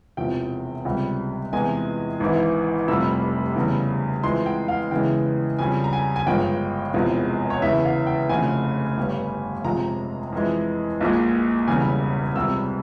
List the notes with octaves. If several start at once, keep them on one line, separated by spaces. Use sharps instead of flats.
E1 E2 C3 F3 G5
C#2 C3 G3
E2 C3 E3 G#3 G#5
G#1 G#2 E3
F1 F2 C3 G3 E6
E2 C#3 G3
F2 E3 G#3 C6
G5
F5
E2 C#3 E3 G#3 G5
F2 C#3 G3 G#5
A#5
G#5
G#5
G1 G2 F3 G#3 G5
E1 E2 C3 F3 G#3
C#5
E1 E2 C#3 E3 E5
F5
G5
F1 F2 C#3 G#5
G1 G2 G3
F2 C3 F3 G#3 A#5
F2 E3 G#3
A#1 A#2 G#3
E1 E2 C#3 G3 G#5
C#2 C3 G3 E6